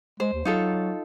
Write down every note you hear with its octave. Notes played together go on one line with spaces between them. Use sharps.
G#3 C5
D#2
F#3 D#4 F4 A4